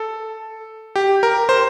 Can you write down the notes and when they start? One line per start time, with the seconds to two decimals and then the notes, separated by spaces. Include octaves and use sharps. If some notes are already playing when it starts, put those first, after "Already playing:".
Already playing: A4
0.96 G4
1.23 A#4
1.49 C5